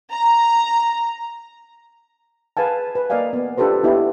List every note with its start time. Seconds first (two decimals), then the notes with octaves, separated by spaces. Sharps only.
0.11 A#5
2.57 G#4 B4 F5 G#5 A5
2.95 B4
3.10 A#3 A#4 D5 D#5 F5 G#5
3.33 B3
3.58 D4 F4 G4 A4 B4 C5
3.83 B3 E4 G4 D#5